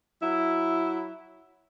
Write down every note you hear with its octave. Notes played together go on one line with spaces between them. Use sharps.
F#3 E4